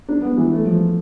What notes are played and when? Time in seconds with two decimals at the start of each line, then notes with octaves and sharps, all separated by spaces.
0.08 D4
0.22 B3
0.37 E3
0.52 A3
0.66 F3